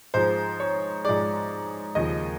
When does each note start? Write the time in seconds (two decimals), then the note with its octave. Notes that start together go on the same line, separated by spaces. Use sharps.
0.14 G#2 F3 G#3 C5
0.60 C#5
1.05 G#2 F3 G#3 D5
1.95 D#2 C#3 F3 D#5